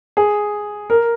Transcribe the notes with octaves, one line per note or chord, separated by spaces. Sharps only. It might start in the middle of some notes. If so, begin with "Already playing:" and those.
G#4
A#4